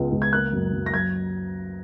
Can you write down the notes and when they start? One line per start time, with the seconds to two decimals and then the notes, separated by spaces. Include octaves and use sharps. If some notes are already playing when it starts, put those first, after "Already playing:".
Already playing: C#2 G#3 B3
0.12 C#2
0.22 G#6
0.33 A#3 F#6
0.53 F#2
0.73 F#2
0.86 A#6
0.93 F#3 G#6